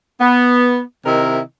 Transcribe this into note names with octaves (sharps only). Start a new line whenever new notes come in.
B3
C3 D#3 E4 A#4 D#5